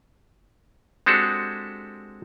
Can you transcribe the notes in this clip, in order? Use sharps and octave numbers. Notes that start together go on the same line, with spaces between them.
G#3 C4 D4 F#4 G4 A4